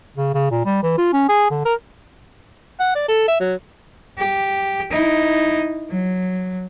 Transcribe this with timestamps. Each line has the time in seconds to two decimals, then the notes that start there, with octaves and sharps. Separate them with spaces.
0.17 C#3
0.35 C#3
0.51 A#2
0.65 G3
0.83 E3
0.98 F4
1.13 C#4
1.29 G#4
1.51 D3
1.65 A#4
2.80 F#5
2.95 D5
3.08 A4
3.28 E5
3.40 F#3
4.18 G4
4.90 D#4 E4
5.90 F#3